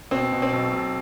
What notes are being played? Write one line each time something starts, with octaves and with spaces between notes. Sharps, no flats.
B2 C4
B2
C4
B1
B1